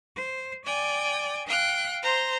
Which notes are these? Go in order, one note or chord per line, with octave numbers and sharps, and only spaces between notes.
C5
D5 G5 G#5
F5 G5 F#6
C5 A#5 C6